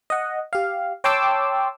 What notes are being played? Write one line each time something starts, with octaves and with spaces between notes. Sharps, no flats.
D#5 F#5
G4 F5
C#5 G5 A5 C6 D6 E6